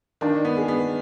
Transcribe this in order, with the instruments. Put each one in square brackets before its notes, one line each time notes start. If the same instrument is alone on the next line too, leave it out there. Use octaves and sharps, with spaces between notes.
[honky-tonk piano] D#3 [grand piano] D4
[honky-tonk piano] B3
[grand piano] G#4
[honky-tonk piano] B3